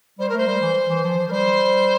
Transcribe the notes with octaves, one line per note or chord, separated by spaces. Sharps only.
G3 C5
A#4
A3 C5
G3
E3
E3
F3
F3
A#4
G3 C5